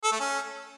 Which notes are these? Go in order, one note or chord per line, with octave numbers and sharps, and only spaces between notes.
A4
A3
C#4